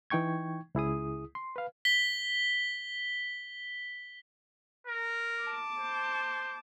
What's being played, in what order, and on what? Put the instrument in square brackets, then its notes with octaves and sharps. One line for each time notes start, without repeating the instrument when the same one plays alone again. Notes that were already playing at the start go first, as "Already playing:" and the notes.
[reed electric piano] E3 D#4 G5 C#6 G#6
C#2 E4 G#4 D#6
C6
B4 F5
[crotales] B6 G7
[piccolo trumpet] A#4
[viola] A5 D6
[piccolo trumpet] C5